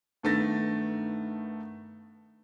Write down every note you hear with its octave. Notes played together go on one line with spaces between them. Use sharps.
G2 D#3 A3 B3 A6 A#6